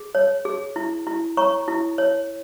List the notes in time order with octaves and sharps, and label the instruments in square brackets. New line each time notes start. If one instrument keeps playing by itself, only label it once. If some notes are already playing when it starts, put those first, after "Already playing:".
Already playing: [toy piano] G#4
C#5
G#4
E4
E4
C#5 A#5 C#6
E4
C#5